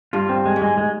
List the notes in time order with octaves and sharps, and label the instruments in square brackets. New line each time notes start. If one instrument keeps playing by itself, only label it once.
[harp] G2 [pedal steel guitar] F4
[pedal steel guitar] C4
G#3
[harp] G#2
[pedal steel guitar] G#3
G#3